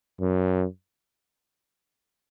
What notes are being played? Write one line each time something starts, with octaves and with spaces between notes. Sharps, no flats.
F#2